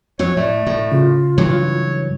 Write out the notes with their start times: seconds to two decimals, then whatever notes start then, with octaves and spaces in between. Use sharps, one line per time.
0.19 F2 F#3 C#5
0.37 A2 A3 D5
0.67 A2
0.92 C#3 F4
1.38 G2 E3 F#3 C#5